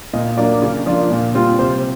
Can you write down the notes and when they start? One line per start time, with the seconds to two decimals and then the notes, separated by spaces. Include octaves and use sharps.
0.14 A#2 D#5
0.38 F#3 A#3 D4 D5
0.62 C#3
0.86 F3 A#3 D4 F4
1.11 A#2
1.35 G3 C4 F4
1.59 C3 C5